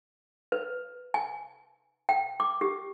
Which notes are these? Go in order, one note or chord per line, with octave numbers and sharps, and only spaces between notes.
B4
G#5
G5
D6
G4